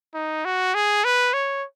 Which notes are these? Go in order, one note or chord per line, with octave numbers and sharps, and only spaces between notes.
D#4
F#4
G#4
B4
C#5